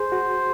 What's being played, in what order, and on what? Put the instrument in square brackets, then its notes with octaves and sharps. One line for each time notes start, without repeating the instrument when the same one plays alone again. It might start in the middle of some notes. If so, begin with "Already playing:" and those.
Already playing: [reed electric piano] G#4 [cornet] C5
[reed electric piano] F#4